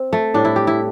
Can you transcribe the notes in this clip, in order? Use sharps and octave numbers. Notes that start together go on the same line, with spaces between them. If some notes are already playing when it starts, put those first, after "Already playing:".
Already playing: C4
A3
A2 G3 D4
E4
G4
E4